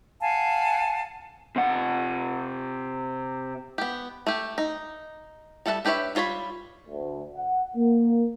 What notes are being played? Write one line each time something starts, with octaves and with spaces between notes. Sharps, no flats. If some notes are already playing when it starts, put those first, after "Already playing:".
F5 F#5 G#5 A5
C3 F#5
B3 G4
A3 G4
D#4
G3 A4 E5 F#5 A5
D4 G4 B4 C#5 E5
G3 F4 C#5 A5 B5
D2
F#5
A#3